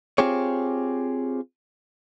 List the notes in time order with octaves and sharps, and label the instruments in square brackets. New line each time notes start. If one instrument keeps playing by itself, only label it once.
[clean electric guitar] C4 F4 G4 G#4 C#5